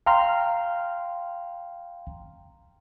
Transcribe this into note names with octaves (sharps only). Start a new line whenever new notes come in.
F5 G5 A#5 C6 F6